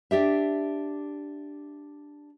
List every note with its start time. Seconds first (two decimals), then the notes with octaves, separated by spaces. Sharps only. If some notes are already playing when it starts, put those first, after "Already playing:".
0.11 D4 G4 E5